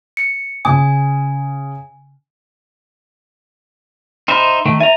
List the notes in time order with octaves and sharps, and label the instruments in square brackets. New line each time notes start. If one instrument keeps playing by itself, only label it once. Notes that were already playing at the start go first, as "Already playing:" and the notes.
[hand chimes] C#7
[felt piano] C#3 D#6 [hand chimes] G#5
[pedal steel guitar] D#4 C5 E5 [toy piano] G#5 B5
[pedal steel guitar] D#3 A3
[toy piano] E5 [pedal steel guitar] G#5 A#5